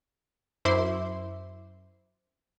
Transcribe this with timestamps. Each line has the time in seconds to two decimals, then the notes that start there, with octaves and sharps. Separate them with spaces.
0.65 F#2 E4 C5 E5 C6 D6